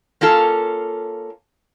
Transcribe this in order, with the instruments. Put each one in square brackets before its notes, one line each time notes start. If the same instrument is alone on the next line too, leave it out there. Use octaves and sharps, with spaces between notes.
[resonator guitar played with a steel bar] A#3 C#4 F4 A4